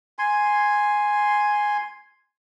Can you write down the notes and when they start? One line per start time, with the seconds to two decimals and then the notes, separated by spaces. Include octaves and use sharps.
0.19 G#5 C6